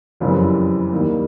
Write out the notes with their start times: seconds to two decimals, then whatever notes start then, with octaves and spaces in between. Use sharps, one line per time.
0.20 F#1 F2 C#3 E3 G3
0.92 D#2 D#3 G3 A#3